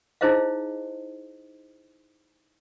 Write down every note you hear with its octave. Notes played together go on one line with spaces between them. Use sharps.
D#4 E4 G#4 C5 D#5 F5